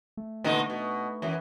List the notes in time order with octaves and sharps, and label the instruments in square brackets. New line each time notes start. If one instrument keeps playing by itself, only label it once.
[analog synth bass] A3
[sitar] A#2 D3 D#4
B2
F#2 E3